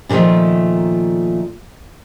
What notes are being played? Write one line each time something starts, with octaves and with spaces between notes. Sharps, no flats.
A#2 D3 D#3 F3 A3